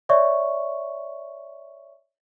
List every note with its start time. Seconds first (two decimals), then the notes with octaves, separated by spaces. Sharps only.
0.09 C#5 D5 E5 C#6